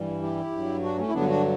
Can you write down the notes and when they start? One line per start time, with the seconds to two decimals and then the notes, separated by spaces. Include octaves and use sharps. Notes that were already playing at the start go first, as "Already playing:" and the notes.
Already playing: G2 E3 G3
0.22 E4 G4
0.52 G2
0.57 F#3
0.83 D4 F#4
0.98 A3 C#4
1.09 E4
1.13 G2 D3 F#3 B3 D4
1.28 D4 F#4